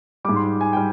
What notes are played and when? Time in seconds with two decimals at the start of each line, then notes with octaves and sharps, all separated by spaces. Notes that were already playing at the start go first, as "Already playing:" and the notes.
0.25 G#2 G3 D6
0.36 C6
0.61 G#5
0.73 G3 G5